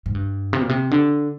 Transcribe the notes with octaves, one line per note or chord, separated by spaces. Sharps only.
G#2
G2
C3
A#2
C3
D3